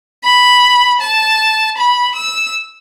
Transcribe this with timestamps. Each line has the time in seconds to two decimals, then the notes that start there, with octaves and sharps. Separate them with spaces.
0.23 B5
1.00 A5
1.77 B5
2.15 E6